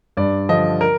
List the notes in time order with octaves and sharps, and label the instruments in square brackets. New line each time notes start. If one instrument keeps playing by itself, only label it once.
[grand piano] G2 D5
D3 F3 D#5
A#4